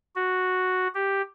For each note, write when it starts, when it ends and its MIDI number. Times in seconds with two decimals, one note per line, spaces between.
0.16 0.88 66
0.95 1.22 67